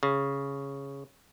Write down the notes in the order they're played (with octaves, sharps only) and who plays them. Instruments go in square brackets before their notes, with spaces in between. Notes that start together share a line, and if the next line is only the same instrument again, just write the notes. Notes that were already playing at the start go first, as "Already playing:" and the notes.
[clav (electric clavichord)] C#3